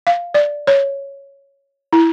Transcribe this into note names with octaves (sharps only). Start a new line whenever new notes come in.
F5
D5
C#5
E4